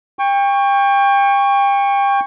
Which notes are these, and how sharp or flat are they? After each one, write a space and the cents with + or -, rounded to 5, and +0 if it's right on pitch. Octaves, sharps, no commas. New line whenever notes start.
G5 +30 C#6 +0